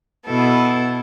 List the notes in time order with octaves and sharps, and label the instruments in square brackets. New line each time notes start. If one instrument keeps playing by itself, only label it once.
[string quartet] B2 B3 E4 A4